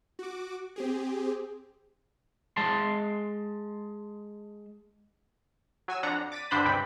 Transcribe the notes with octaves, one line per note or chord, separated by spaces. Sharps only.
F#4 D6
C4 G4 G#4
G#3 A5 C6
F#3 G#5 E6
F2 D4 F#5 A#5
D6 A6 B6 D#7
G2 D3 D4 C5 B5 G6
C#2 G2 C3 G5 B5